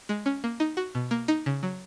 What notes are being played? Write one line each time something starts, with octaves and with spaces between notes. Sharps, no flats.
G#3
C#4
A#3
D#4
F#4
B2
A#3
D#4
C#3
F#3